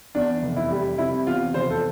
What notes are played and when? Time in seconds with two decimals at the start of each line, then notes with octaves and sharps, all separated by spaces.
0.15 E2 D4
0.42 F1
0.56 E4
0.71 G3
0.98 C3 E4
1.26 E2 F4
1.54 F1 C5
1.70 A4